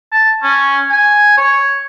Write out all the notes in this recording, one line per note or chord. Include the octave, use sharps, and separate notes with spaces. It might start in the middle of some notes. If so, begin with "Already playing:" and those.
A5
C#4
G#5
C#5